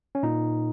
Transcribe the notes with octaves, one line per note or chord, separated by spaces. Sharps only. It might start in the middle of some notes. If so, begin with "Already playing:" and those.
C#4
A#2 D#4